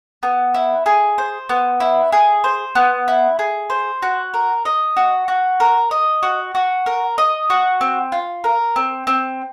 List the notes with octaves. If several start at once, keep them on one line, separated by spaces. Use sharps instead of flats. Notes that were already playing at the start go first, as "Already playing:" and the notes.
B3
E4
G#4
C5
B3
E4
G#4
C5
B3
E4
G#4
C5
F#4
A#4
D#5
F#4
F#4
A#4
D#5
F#4
F#4
A#4
D#5
F#4
C4
F4
A#4
C4
C4